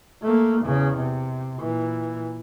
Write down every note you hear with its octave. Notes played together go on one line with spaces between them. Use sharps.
A3 A#3
E2 C#3
C3
A#2 E3